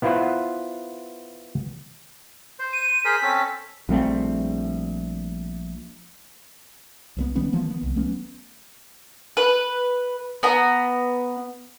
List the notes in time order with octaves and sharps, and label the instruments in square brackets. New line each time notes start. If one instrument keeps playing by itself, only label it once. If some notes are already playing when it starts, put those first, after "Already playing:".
[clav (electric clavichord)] B3 E4 F4 B4 C5 F#5
[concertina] C5
[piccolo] D#7
[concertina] G#4 A#4 C5 [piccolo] B6
[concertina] C4 C#4 A4
[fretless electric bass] A#1 G3 A3 C4
C2 F3 B3
D#3 G3 B3 C#4
E3 F3 A#3 B3
D#3 B3
C2 D#3
F#3 A3 B3 C#4
[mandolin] B4
B3 A#5